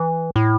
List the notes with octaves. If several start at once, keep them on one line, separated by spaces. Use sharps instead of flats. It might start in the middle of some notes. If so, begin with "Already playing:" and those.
Already playing: E3
A2